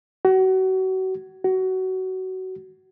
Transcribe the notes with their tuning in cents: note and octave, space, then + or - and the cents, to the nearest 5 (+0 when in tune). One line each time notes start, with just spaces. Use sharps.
F#4 +30
F#4 +20